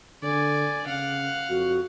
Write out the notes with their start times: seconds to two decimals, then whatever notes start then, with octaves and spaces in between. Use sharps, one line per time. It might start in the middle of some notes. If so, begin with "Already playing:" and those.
0.23 D3 D5 G#5
0.86 C#3 F5 F#5
1.50 F2 F#4